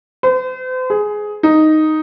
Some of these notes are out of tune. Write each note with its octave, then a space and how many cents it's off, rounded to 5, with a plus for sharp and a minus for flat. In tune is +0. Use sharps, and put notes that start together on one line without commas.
C5 -40
G#4 +10
D#4 +0